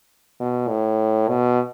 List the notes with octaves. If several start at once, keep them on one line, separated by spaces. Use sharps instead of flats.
B2
A2
B2